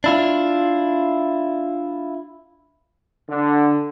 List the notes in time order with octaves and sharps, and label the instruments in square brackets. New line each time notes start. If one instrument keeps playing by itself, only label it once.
[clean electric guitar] D4 E4 F4
[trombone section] D3